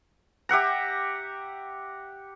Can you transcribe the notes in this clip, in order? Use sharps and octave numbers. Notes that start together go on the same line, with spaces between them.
G4 E5 F#5 A#5